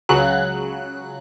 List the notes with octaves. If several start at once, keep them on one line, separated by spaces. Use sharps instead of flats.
C#2 C#3 F#3 F#6